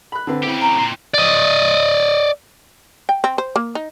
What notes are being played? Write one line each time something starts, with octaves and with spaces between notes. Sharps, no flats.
B5 F#6
D3 C4 B4
C#3 C4 E4 G4
A#5
A#2 C4
D5 D#5
G5
C4
C5
A#3
D#4